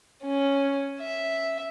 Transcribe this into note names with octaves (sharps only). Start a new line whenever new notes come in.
C#4
E5